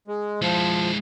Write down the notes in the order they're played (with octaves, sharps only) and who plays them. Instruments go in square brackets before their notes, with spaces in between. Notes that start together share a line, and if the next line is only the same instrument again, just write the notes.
[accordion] G#3
[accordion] F3 [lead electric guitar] G#3 E4